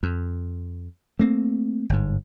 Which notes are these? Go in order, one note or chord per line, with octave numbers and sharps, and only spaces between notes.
F2
A3 A#3 C4
G1 G#2